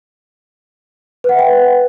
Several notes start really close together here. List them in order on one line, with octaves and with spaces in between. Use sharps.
B4 F#5 E5 G5